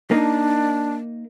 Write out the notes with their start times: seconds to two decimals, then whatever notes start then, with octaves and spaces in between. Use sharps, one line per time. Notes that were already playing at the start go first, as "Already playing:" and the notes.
0.11 A#3 D4 D#4